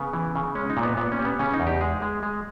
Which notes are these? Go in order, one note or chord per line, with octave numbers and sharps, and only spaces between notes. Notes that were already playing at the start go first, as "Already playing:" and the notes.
Already playing: C#3 B3
E3
C#3
G#3 C#4
D#4
A#2
B3
A#2 B3
C#4
G3
B3
C#3 C#4
D#4
E2
G4
G#3 G#4
G#3
G#3